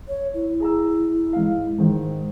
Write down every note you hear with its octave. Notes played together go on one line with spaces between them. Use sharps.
C#5
E4
G#4 A#5 E6
G#2 F5
G#2 D#3 C5